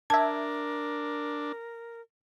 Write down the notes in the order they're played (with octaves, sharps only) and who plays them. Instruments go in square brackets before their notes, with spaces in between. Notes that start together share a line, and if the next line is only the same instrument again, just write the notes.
[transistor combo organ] D4 [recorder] A#4 [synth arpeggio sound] E5 G#6 [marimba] A5